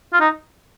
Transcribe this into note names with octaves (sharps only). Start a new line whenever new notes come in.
F4
D#4